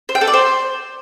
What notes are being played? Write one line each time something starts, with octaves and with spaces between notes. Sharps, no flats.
C5
G5
A4
D5
C5